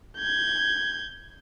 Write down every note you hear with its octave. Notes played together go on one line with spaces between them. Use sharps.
G6 G#6